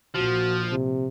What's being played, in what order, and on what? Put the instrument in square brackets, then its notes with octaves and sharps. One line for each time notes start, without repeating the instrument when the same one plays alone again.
[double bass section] A#1 [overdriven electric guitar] F3 [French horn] F#4
[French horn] C3